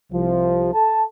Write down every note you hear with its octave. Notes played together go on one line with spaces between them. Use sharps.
C2 C3 F3
A4 A5